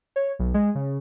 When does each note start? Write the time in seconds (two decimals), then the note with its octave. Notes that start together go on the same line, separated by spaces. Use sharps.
0.16 C#5
0.39 B1
0.54 G#3
0.75 C#3